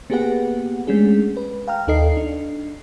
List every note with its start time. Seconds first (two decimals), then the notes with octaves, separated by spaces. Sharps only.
0.10 A#3 B3 G4 G#4 B4 F#5
0.87 G#3 A3 C#4 D4 G#4
1.37 B4
1.68 F5 G5 A#5 F6
1.87 D#2 D#4 A4 D#5 C7
2.17 D4